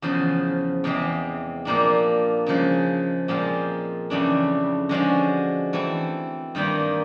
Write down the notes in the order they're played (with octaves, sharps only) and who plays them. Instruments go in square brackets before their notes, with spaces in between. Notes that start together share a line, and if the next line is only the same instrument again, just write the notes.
[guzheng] E2 C#3 F3
E2 C3 E3 G#3 C4
A#2 F3 A#3 D4
C#3 F3 G#3
A#2 F3 G#3 C4 F4
F2 C#3 E3 A3 D4
D3 F3 G#3 C#4 F#4
E3 A3 C4 E4
G2 D#3 G3 A#3 D#4